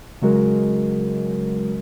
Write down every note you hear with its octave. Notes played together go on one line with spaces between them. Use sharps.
C#3 F#3 G#3 F#4 A#4